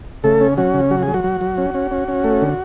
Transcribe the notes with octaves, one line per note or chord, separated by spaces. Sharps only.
C#3 A3 A4
C#4
F#3 C#4 F#4
C#3
F#3 F#4
F#3 G#4
F#3 F#4
F#3
F#3
C#4
C#4
C#4
C#4
A3
D3